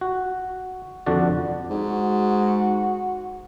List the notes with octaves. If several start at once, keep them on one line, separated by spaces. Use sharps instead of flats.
F#4
F2 D3 D4 F#4 D5
G#2 F#4